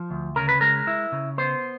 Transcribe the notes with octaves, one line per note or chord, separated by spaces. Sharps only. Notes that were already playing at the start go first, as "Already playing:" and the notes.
Already playing: F3
D2
C#3 A#4
B4
G#3 A#4
E4
C#3
B3 C5